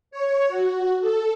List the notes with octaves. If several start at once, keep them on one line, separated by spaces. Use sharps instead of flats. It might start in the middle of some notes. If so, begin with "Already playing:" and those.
C#5
F#4
A4